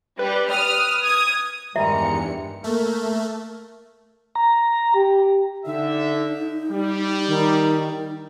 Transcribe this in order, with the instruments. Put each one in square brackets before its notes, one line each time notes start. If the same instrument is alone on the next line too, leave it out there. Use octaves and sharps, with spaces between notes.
[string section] G3 [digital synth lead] B4
[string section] D#6 F6
D#6 G#6
[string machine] E2 G2 C#7 [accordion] D#3 G3 G#3 [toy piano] E5 [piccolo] A#5
[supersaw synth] A3 [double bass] A#3
[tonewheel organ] A#5
[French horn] G4
[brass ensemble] D3 E5 [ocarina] D#4
[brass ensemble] G3
[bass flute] D#3